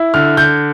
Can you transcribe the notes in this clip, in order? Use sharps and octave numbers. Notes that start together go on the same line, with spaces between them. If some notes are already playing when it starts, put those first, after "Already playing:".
Already playing: E4
D3 F6
D3 G6